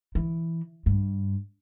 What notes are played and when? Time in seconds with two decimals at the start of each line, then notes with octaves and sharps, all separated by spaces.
0.15 E3
0.86 G2